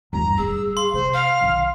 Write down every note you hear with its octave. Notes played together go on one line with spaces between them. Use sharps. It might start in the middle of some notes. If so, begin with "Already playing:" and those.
E2 G2 A#5
D1 G3 G#4 E6
F5 C6
C3 C5
F5 F6
B1 D#3